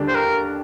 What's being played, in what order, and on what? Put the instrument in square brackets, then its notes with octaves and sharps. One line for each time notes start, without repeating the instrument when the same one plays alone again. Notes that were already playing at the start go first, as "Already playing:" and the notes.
Already playing: [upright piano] D#2 D3 G3 D4 G4
[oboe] C5
A#4